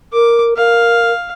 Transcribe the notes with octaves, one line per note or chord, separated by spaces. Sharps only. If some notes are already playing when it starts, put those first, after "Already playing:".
A#4 D6
A#4 F5